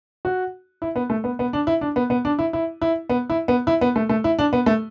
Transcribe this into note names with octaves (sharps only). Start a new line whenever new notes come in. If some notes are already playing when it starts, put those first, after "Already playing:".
F#4
E4
B3
A3
B3
B3
D4
E4
D4
B3
B3
D4
E4
E4
E4
B3
E4
B3
E4
B3
A3
A3
E4
D4
B3
A3